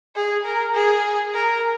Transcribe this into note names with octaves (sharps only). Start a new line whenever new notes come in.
G#4
A#4
G#4
A#4